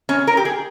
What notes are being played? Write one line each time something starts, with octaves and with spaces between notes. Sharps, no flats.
C#4
A#4
G4
G#4